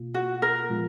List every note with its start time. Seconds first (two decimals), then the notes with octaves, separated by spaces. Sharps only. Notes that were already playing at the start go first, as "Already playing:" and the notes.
Already playing: B2 A#3 F4
0.14 F#4
0.42 A#4
0.70 A#2 F3 G#3 B3 F4